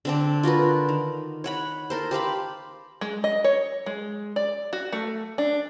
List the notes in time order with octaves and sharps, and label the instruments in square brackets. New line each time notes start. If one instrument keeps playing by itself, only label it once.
[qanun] D3 C4 D4
F4 F#4 A#4 B4
D#3
C#5 F#5 B5
A4 A#4 C5
G4 C5 F5 B5
[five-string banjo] G#3
D#5
C#5
G#3
D5
F#4
A3
D4